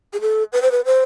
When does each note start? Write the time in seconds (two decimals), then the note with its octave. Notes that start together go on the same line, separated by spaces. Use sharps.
0.13 G#4
0.21 A4
0.53 B4
0.62 C5
0.71 B4
0.85 C5